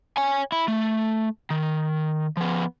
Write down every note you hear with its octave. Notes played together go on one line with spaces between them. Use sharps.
C#5 G#5
E4
A3
D#3
F3 B3